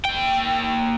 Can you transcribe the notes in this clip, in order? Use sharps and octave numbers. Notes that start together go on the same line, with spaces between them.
A#3 G5